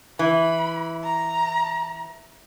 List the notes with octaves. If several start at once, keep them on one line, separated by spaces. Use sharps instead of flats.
E3 B5
A#5